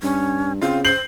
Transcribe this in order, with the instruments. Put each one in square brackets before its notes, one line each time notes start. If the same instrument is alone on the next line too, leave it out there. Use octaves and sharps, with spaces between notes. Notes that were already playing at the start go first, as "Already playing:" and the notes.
[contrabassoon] G2 [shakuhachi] C#4
[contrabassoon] C#3 [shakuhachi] C4 [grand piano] F4
[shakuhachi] C5 [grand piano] G6 C7 F#7